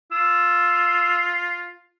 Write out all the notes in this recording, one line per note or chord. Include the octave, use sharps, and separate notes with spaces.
F4 E6